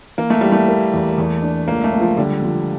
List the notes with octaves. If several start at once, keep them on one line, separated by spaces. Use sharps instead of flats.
E3 A#3
A3
G3 E4
A3
A#3
E2
E2
D4
C#2 A#3
A3
C#2
F3
D3 G3
F3